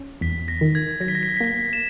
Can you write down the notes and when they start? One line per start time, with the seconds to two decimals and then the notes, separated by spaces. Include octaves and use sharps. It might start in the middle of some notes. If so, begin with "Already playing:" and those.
Already playing: C#4
0.21 E2 B6
0.48 A#6
0.61 D#3
0.75 G#6
1.00 F#3 A#6
1.08 B6
1.15 A#6
1.23 B6
1.29 A#6
1.37 B6
1.41 A#3 A#6
1.73 E7